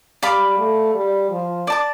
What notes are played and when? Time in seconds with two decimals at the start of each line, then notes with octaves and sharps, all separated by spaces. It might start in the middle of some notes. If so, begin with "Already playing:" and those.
0.23 G3 D5 F5 B5 D6
0.58 A3
0.95 G3
1.31 F3
1.67 D5 A5 D6